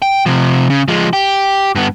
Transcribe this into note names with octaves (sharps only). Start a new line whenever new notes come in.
G5
C3 F3
C#3
F3 G#3
G4
G2 B3